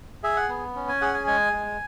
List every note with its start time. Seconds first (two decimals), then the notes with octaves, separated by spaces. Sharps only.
0.23 G#4 E5
0.36 F#5
0.49 B3
0.75 C#4
0.88 G#5
1.01 G#4 F#5
1.14 G#5
1.27 G#3 G#5
1.53 G#3